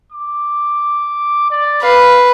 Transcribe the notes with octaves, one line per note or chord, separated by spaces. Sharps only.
D6
D5
B4 F5